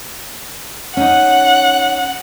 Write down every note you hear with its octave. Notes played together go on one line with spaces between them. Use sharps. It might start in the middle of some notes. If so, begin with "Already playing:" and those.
C#4 D#4 F#5